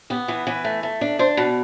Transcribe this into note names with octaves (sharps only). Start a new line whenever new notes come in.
B3 G4
E3 B4
E3 B4
A3
A3
D4
D4 C5
B2 B4